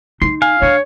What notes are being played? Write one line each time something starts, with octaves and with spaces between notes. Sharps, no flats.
D#4 C6
F5 G#5
D4 C#5